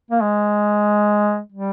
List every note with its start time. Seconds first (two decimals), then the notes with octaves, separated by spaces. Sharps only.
0.11 A#3
0.22 G#3
1.53 G3